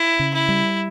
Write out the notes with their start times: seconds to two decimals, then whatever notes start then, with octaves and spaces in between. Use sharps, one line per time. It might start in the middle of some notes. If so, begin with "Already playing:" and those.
Already playing: E4
0.19 C#3
0.34 E4
0.49 G3